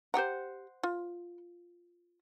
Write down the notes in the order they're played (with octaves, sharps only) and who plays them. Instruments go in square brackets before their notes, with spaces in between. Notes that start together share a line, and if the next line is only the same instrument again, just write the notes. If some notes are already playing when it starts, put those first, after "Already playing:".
[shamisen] G4 G5 A#5 [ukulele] C5 F#5
[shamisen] F4